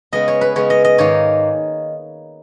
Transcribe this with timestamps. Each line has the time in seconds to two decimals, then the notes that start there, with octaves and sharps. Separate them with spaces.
0.12 C#3 G#3 B3 D#5
0.28 C#5
0.41 B4
0.56 C#3 G#3 B3 C#5
0.70 D#5
0.84 D#5
0.98 G#2 D#3 A#3 C#5